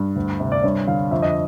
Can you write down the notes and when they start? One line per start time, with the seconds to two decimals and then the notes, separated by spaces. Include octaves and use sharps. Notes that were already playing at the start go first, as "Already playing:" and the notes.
Already playing: G2
0.16 D2
0.40 C3
0.52 D5
0.63 G2 C#5
0.87 D3 F5
1.11 F2 E5
1.22 D#5